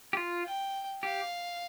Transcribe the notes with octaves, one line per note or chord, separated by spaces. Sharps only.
G4
F4
G5
G4 F5